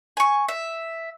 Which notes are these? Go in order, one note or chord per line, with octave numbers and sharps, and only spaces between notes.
G#5 C#6
E5